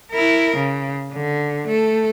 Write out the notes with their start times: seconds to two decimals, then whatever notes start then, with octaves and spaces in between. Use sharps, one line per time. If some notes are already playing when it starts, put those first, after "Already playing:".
0.12 E4 A#4
0.56 C#3
1.13 D3
1.68 A3 A4